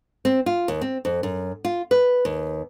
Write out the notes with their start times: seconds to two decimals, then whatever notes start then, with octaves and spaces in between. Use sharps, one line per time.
0.25 C4
0.46 F4
0.68 D#2
0.81 C4
1.05 F2
1.23 F#2
1.65 F4
1.91 B4
2.25 D#2